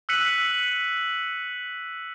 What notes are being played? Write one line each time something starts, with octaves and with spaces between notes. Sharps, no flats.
E6 F#6 B6 C#7 D#7 F#7